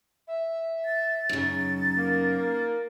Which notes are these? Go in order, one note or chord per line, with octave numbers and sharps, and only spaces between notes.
E5
A6
F#2 C#3 D#4
A#3